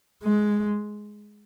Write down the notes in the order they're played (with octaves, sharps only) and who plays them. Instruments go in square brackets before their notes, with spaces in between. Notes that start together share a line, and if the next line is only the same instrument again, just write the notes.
[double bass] G#3